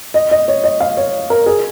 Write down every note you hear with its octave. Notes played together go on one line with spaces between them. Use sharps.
D#5
D#5
C#5
D#5
F5
C#5
A#4
G#4